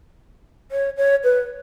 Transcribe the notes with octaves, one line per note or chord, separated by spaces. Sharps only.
C#5
C#5
B4